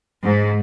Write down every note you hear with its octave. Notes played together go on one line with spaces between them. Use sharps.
G#2